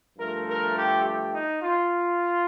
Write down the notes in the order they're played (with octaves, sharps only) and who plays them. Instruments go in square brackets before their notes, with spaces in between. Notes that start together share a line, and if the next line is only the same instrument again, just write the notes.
[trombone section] G2 F3 A3 A#4
A#4
G4
G4
D#4
F4